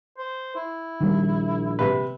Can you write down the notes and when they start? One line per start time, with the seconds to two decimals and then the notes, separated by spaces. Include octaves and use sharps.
0.18 C5
0.55 E4
1.00 A#1 D#3 G3 A#3
1.79 C3 B4